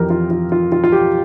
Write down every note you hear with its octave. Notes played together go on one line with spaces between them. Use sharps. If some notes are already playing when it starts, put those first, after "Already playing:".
Already playing: F2 E3 G4 A#4
F4
F4
F4
F4
F4
G4